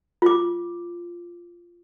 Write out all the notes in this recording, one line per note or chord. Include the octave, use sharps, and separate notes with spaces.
F4 D6